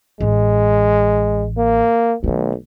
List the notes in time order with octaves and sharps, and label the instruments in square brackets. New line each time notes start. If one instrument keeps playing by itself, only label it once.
[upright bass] A1 [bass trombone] G#3
[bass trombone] A#3
[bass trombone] B1 [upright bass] D#3 A3